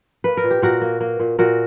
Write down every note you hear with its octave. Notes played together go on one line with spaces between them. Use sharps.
A#3 B4
A#4
A#2
G4
A#2 F#4 A#4
A#3
A#3
A#2
A#2 F#4 A#4